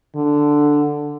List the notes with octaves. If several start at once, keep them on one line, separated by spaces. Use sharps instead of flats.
D3